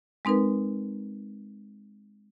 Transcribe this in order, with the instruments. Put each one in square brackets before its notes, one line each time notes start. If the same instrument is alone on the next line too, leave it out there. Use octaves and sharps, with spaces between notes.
[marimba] G#3 C4 D#4 A#4 B4